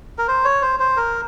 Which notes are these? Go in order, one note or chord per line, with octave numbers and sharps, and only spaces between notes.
A#4
C5
C#5
C5
C5
A#4